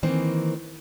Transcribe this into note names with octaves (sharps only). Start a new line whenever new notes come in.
D#3 E3 A#3 C4